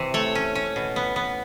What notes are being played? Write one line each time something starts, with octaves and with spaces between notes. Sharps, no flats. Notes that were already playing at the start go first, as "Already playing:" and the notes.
Already playing: C3 E3
A3 C#5
C#4
C#4
B2
B3
B3